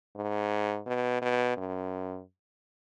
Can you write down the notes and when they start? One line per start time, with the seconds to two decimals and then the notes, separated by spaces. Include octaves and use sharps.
0.16 G#2
0.86 B2
1.22 B2
1.57 F#2